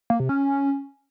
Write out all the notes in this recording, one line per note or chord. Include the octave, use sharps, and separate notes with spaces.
A#3
C3
C#4